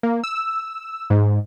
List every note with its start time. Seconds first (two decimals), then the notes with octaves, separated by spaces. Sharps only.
0.03 A#3
0.24 E6
1.10 G#2